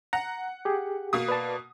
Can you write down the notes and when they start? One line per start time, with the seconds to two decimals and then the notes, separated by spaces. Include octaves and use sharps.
0.13 F#5 A#5
0.65 G4 G#4
1.13 B2 A#3 D#6
1.28 B4 D5 A5